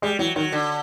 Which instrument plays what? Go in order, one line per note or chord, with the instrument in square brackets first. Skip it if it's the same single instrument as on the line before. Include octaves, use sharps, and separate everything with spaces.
[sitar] G3 [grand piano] G#3
[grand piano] E3 [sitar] F#3
[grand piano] D#3 [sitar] F#3
[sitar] D3